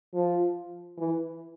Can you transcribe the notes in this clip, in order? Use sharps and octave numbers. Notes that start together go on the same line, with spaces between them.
F3
E3